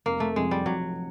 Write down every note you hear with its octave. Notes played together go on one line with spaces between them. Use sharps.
F1 A#3
A3
F2 C3 F3 G#3
G3
F1 F#3